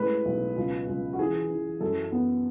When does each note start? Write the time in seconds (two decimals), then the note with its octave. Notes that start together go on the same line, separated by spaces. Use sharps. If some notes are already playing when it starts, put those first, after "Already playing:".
Already playing: A2 G#3 B4
0.25 B1
0.56 C#2
0.87 C#2
1.13 F#4
1.19 E3 G#4
1.50 E3
1.81 F#2 A4
2.12 B3